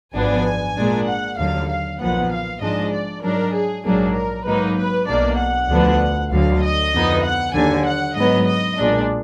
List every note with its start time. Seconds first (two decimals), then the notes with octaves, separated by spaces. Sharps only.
0.14 G#1 F#2 F3 B3 D4 G#5
0.77 A#2 G#3 D4
1.06 F#5
1.37 D#2 D3 F#3 F5
1.68 F5
1.99 B1 A#2 F3 B3 F#5
2.30 F5
2.61 G#2 F3 G#3 D4 D#5
2.92 D5
3.22 G#2 F#3 D4 A#4
3.53 G#4
3.84 A#1 G#2 F#3 A#3 D4 G#4
4.15 A#4
4.46 G#2 F#3 A#3 D#4 B4
4.76 B4
5.07 B1 B2 A#3 D4 D5
5.39 F#5
5.69 D2 D3 F3 B3 D4
6.31 D2 D3 F#3 F5
6.62 D#5
6.92 F2 D3 F3 B3 D#4
7.24 F#5
7.54 D#2 D3 F#3 G#5
7.85 F#5
8.15 G#2 F#3 B3 D#5
8.47 D#5
8.78 B1 A#2 G#3 D4